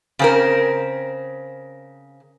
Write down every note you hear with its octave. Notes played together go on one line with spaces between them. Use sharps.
C#3 C4 A#4